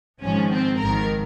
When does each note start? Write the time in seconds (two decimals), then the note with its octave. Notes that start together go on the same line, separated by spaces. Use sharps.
0.23 G#1 G#2 F3 C#4
0.51 C4
0.79 G#1 G#2 D#3 A#4